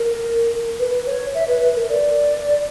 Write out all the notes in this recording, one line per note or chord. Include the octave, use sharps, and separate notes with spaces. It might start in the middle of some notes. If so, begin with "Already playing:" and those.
Already playing: A#4
B4
C#5
E5
B4
B4
A#4
D5